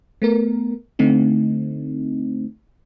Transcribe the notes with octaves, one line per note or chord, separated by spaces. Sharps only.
A3 B3 A#4
D3 A3 C4 D#4